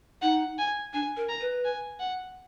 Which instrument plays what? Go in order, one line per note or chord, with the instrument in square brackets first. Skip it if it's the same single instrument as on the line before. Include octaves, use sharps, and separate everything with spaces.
[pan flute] D#4 [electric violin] F#5
[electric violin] G#5
[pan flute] D4 [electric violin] G#5
[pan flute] A#4
[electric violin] A#5
[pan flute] B4
[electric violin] G#5
F#5